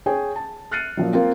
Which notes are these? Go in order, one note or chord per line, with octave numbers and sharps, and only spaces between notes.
G#4 C#5 G5 G#5
A5
F6 F#6 A6 C7 C#7 D#7
A#2 F3 F#3
A#3 C4 F4 A#4